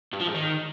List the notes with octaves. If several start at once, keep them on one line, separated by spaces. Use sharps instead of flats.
G2
F3
G#2
D#3